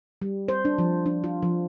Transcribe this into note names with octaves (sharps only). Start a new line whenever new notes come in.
G3
C5
D4
F3
D4
F4
F3